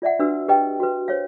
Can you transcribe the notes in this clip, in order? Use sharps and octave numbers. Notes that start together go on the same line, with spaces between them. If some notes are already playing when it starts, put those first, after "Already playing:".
F4 D5 E5 F#5
D4 F#4 B4 E6
G4 B4 D#5 G5
F#4 B4
C5 C#5 F5